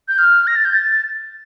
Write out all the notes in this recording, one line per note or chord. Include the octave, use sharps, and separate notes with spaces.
G6
F6
A#6
A6
G6
A6